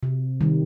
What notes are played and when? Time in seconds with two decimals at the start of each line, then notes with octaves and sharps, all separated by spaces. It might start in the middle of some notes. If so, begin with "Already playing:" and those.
0.03 C3
0.41 D#3 G3